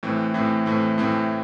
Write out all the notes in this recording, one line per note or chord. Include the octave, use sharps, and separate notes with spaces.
A2 E3 A3 C4
A2 E3 A3 C4
A2 E3 A3 C4
A2 E3 A3 C4